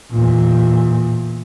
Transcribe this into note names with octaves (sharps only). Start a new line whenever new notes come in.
E2 A#2